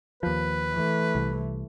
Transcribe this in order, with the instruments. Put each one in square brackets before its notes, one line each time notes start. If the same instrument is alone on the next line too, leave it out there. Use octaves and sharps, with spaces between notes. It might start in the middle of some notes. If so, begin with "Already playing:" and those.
[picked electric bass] D#2 F3 [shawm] B4
[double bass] E3 A3
[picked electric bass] C2